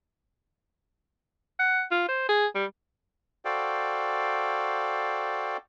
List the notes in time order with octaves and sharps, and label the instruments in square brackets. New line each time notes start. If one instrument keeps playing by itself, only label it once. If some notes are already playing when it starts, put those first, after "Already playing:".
[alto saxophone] F#5
F4
C5
G#4
G3
[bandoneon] F#4 A4 C5 D5 F5 G5